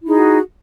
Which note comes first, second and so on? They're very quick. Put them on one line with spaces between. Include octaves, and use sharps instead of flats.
E4 D#4 G#4 F#4